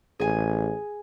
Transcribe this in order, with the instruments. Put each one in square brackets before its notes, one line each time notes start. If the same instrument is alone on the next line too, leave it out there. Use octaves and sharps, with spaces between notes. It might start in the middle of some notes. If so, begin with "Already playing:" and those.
[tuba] A1 [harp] G#4 G#5